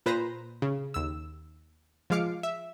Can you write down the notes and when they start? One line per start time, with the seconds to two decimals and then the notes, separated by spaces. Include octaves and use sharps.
0.06 A#2 B4 C5 A#5 A#6
0.62 C#3
0.94 D#2 E6
2.10 F3 G#3 F5 D6 C#7
2.43 E5